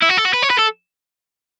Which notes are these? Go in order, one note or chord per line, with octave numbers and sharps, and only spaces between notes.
E4
F#4
A4
F#4
B4
C#5
B4
A4